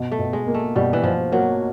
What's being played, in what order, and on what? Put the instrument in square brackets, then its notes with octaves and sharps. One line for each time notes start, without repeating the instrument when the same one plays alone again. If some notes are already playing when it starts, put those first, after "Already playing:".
Already playing: [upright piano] B2
[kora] A3
[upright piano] B2
[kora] G#3
[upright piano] A#3
[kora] A3
[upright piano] B2 [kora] G3
[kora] E3
[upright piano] B2 [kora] F3
[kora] F#3 [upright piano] A#3